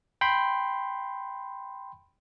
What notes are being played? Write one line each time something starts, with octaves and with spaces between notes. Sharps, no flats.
G5 B5 C6